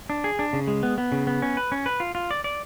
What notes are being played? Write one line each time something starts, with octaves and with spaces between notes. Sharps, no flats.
D4
G#4
D4
C#3
G#3
B3
B3
C#3
B3
C#4
B4
C#4
B4
F4
F4
D5
D5